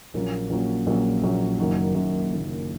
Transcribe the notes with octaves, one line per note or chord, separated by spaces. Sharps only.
A#1 A#2 F#3 A#3 C#4
A#1 A#2 F#3 A#3 C#4
A#1 A#2 F#3 A#3 C#4
A#1 A#2 F#3 A#3 C#4
F#1 F#2 D#3 F#3 A#3
F#1 F#2 D#3 F#3 A#3
F#1 F#2 D#3 F#3 A#3